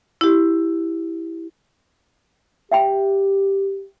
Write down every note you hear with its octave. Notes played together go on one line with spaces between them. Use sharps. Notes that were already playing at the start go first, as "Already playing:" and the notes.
E4 G4
G4 E5 G5 B5